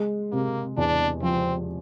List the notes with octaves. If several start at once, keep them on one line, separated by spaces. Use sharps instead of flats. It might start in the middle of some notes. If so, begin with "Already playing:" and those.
Already playing: G#3
C3 A#3
E2 D4
F3 C4